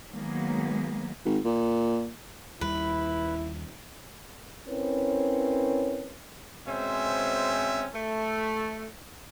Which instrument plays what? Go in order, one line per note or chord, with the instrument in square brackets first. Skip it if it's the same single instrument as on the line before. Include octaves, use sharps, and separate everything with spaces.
[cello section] D#3 F#3 G#3 A#3 B3
[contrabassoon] G#1
A#2
[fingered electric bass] D#2 G3 [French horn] E4 [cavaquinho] B4
[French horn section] C4 C#4 E4 A#4 B4 C#5
[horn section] B2 G#3 C4 C#4 C5 E5
A3